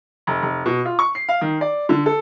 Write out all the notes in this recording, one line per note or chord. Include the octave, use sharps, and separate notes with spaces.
F1
F1
B2
F4
C#6
C7
F5
D#3
D5
D3
A4